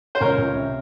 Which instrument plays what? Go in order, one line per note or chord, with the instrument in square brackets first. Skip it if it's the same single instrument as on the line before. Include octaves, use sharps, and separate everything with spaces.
[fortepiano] C5
[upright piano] C#2 [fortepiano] A#4 C#5
[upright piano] C#2
C3